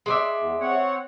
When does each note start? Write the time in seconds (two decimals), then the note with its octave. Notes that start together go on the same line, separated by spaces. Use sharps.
0.06 G#3 D5 E5
0.37 E2
0.60 C4 C#5 F#5